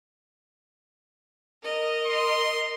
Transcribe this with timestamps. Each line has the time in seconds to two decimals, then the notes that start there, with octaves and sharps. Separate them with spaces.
1.63 A#4 D#5
2.07 C6